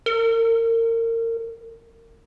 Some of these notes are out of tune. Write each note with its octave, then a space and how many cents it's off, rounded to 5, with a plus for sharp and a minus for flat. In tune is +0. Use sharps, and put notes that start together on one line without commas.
A#4 -30